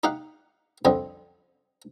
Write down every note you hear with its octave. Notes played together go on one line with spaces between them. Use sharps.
D#4 G4 F5 F#5
F2 D3 G3 C4 D#5